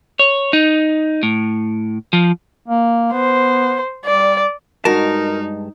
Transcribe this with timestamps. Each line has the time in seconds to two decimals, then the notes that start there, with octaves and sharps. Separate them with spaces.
0.19 C#5
0.53 D#4
1.23 A2
2.13 F3
2.69 A#3
3.13 B3 C5
4.05 G3 D5
4.85 G2 G#3 D#4 F#4 A#4 A5